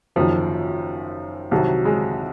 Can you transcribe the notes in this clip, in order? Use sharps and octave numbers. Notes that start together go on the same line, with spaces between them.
F#1 F#2 D#3 F3
C2 C3 D#3 F#3
G#3